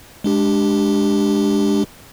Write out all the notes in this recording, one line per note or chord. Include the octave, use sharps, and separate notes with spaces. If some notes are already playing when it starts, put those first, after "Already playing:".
G#3 D4 G4